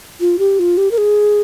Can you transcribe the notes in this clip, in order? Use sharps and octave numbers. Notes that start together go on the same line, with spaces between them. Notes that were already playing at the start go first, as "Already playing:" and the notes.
F4
G4
F4
G4
A#4
G#4